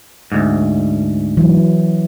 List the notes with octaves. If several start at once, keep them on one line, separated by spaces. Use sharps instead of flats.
D2 G#2
E3 F#3